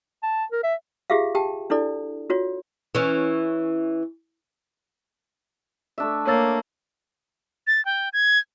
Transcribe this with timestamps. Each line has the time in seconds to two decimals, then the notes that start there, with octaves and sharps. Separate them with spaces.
0.23 A5
0.52 A#4
0.63 E5
1.10 F4 G4 G#4 E5 F5
1.35 G4 G5 A5
1.70 D4 E4 A4 D5
2.30 F4 F#4 C#5
2.95 E3 C#4
5.98 A3 D4 E5
6.27 A#3 C#5 E6 A6
7.67 A6
7.85 G5
8.13 G#6